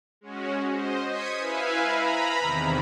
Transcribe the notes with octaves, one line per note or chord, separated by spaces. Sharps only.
G#3 C#4 F#4
C5 D#5
D#6 G#6 B6 C#7 D#7
E4 B4 E5 F5 G#5
A#5 B5
E2 C3 D#3